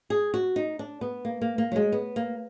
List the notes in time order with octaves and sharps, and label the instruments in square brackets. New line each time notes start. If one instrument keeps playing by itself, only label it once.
[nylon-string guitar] G#4
F#4
D#4
D4
B3
A#3
A#3
A#3
F#3
G#3
B3
A#3